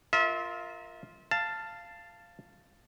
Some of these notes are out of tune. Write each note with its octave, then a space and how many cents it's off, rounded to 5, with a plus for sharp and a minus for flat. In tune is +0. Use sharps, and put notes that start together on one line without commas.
F4 +0 A#4 +0 E5 -35
F5 -10 A5 +10